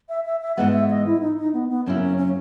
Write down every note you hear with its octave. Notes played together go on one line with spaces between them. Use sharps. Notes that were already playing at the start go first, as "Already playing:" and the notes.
E5
E5
E5
G#2 E3 G#3 B3 F#5
E5
D#5
E4
D#4
D#4
B3
B3
F#2 C#3 F#3 A#3 C#4 E4
C#4
C#4